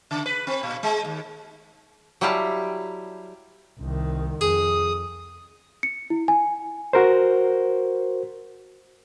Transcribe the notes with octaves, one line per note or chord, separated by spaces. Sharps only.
C#3
B4
C4
A#2
G#3
D#2
F#3 G3 E4 G4 F5 A5
C2 D#3
F2 G#4 D#6
C#7
E4
G#5
F#4 A#4 C5